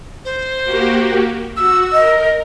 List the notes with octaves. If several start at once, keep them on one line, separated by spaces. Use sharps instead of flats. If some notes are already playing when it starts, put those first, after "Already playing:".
C5
A#3 F#4 G4
F#4 E6
A#4 D#5